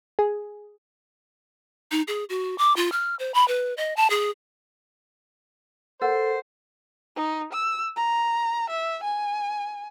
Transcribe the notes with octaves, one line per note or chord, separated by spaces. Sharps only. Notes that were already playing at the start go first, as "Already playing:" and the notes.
G#4
D#4
G#4
F#4
D6
F4
F6
C5
B5
B4
D#5
A5
G#4
A4 A#4 C5 F#5
D#4
E6
A#5
E5
G#5